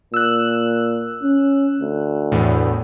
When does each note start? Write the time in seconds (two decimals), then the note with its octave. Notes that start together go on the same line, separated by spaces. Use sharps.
0.14 A#2 E6 F#6
1.23 C#4
1.81 D2
2.32 E2 A2